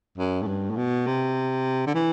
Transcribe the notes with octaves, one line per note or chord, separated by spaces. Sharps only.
F#2
A2
G2
A2
B2
C3
D3
E3